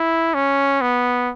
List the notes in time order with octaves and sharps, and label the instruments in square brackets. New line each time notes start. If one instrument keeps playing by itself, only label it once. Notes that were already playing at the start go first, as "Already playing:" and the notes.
Already playing: [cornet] E4
C#4
B3